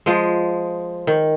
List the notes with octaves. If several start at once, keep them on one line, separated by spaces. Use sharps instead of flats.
F3 G#3
D#3